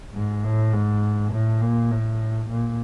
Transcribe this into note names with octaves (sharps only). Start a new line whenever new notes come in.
G#2
A2
G#2
A2
A#2
A2
A#2